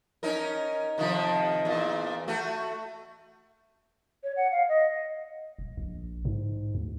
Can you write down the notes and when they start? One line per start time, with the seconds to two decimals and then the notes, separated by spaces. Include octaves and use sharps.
0.23 C#4 D#4 A#4
0.98 C3 D#3 F3
1.65 E2 A#2
2.28 A3 F#4
4.23 C#5
4.37 F#5
4.51 F5
4.69 D#5
5.59 D#1
5.77 A#1
6.25 G#2
6.75 D2